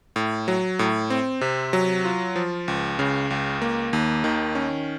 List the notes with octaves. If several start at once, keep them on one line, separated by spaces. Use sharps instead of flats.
A2
F#3
A2
C4
C3
F#3
F4
F3
C#2
C#3
C#2
A#3
D#2
D#3
C#4